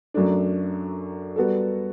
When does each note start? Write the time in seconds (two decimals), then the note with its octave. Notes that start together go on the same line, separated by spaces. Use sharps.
0.14 F#2 F#3 A3 D4
1.36 G3 B3 F#4 A4